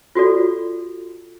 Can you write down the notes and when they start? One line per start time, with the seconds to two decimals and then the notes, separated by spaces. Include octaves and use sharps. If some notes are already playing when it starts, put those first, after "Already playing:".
0.15 F4 F#4 A4 D5